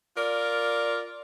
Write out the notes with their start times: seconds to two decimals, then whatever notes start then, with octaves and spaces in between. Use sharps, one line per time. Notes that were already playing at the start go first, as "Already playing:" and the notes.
0.17 F4 A#4 D5